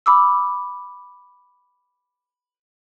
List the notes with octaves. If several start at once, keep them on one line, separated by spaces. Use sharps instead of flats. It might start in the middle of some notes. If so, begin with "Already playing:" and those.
B5 D6 E6